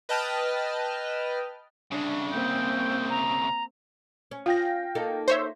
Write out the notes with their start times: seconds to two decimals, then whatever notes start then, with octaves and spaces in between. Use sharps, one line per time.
0.09 B4 D#5 G5 A5 F6
1.91 C2 C#3 D4
2.32 A#3 C4 G5
3.10 A#5
4.31 C#4
4.46 F4 F5 G5 A#6
4.95 A#3 D#4 A4
5.28 C5 C#5 E5